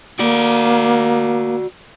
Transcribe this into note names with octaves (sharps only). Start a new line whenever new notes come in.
A#3 F#4 D5